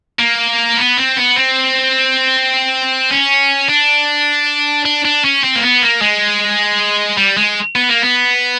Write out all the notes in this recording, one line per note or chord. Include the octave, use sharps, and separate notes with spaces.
A#3
B3
C4
B3
C4
C#4
D4
D4
D4
C#4
C4
A#3
B3
A#3
G#3
G3
G#3
B3
A#3
B3